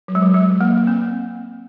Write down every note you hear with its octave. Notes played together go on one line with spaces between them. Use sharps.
F#3
G#3
F#3
G#3
A#3
A#3
C4